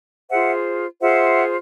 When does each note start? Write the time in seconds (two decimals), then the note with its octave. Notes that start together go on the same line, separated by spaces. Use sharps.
0.29 F4 G#4 C5 E5 F#5
1.00 F4 G#4 C5 E5 F#5